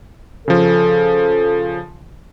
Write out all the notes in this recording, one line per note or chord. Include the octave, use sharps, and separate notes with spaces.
C#3 F3 A4